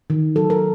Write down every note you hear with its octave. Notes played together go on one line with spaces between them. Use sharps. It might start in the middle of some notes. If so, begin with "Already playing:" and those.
D#3
F#3 A4
A#4